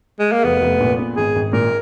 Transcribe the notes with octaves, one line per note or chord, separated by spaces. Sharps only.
G#3
A#3
F1 B3
F1
A#2
B3
G#1 G#4
G#1
A#2 A#4